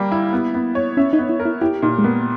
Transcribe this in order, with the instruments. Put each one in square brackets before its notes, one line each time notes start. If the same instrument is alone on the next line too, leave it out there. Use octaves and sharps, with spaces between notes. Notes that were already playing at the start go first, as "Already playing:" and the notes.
Already playing: [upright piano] G3 A#3
E4
B3
B3
C#5
[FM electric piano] C#4 [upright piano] E5
[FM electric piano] D#4
[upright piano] B3
[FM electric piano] E4
[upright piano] A#4
[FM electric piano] E4
[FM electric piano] E4 [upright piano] G4
[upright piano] A#2 [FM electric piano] D#4
[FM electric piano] G#3
[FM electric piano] A#3 [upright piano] B3